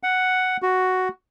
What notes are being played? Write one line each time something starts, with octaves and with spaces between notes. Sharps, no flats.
F#5
F#4